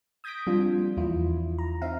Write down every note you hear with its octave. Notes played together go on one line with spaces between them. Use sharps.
D#6 G6 G#6 A#6 B6 D7
F3 G3 C4 D4 F4
A#3
E2 E4 F4
A#5
C4 D#4 E5 F5